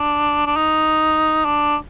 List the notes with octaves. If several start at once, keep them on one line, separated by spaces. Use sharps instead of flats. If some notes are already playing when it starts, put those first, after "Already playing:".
Already playing: D4
D4
D#4
D4